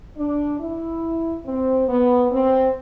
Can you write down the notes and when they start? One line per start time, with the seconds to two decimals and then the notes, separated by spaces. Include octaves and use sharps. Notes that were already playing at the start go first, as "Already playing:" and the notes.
0.18 D4
0.60 E4
1.46 C4
1.89 B3
2.32 C4